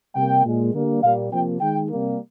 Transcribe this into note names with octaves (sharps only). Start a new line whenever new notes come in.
C3 G3 A#3 G5
A#2 G#3
D3 G3 A#3
A#2 G3 A#3 F5
C3 F3 A#3 G5
D#3 G#3 G5
C3 G3 A#3